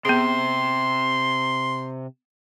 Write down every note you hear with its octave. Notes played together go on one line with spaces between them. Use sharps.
C3 B3 C4 G#4 C6